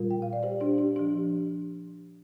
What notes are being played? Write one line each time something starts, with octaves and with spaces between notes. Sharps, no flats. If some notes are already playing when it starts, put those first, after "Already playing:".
Already playing: A#2 G3 F4 A#4
G5
F5
D5
G4 C5
D4 G4
D4 G4
F3 D4 G4